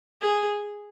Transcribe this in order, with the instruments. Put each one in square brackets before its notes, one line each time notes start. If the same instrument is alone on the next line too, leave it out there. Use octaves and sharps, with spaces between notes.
[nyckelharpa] G#4